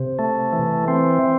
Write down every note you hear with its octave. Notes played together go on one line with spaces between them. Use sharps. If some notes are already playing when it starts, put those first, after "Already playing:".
Already playing: C3
A3
E3
C4